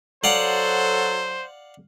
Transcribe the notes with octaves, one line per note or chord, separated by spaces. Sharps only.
F#3 A4 C5 D5 F5 F#5